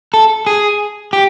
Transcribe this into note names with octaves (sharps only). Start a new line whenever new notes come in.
A4
G#4
G4